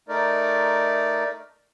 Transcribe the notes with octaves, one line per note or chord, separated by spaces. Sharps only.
A3 D#4 A#4 D5